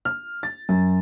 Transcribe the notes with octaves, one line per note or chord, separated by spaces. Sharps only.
F6
A6
F#2